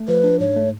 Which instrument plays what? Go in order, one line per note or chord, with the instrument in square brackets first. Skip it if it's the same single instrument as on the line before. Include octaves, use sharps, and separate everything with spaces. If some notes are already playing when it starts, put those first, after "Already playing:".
Already playing: [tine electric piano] A3
[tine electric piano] F3 [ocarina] B4
[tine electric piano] D4
[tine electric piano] G#2 [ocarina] C#5
[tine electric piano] A3